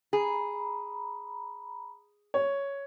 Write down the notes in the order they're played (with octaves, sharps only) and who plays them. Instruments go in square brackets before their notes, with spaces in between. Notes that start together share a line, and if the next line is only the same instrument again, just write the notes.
[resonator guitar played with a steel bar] G#4 [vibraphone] A#5 B5
[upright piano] C#5